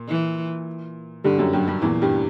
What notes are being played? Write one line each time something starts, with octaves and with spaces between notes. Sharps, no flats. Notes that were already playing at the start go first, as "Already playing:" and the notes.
Already playing: A#2
E3
G2 D3 G3
F#2 F#3
G2 F#3 G3
G2 G3
E2 A#2 E3
G2 G3